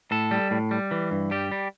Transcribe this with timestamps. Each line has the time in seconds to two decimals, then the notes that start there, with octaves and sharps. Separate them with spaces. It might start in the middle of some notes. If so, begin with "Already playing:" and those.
0.11 A2 A4
0.31 G3
0.51 A2
0.71 G3
0.91 E3
1.11 G2
1.31 G3 G4
1.52 G3